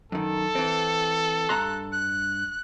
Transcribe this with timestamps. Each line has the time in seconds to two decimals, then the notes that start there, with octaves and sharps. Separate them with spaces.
0.12 F#2 D#3 A4
0.55 E3 C4
1.49 G2 A#5 C6 F#6
1.92 F#6